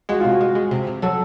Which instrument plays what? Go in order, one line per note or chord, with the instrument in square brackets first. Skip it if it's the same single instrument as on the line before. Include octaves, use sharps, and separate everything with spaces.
[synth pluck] G#3 [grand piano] F#4
[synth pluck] C3 [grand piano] F4
[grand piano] F#4
[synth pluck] G#3
G#3
C3
C3
[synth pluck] F#3 [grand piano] A4